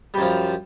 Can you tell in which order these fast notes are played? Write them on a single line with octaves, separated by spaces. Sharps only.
G3 F#2 F3